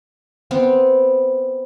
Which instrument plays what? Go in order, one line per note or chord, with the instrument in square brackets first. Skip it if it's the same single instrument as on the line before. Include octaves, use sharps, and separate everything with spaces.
[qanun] B3 C4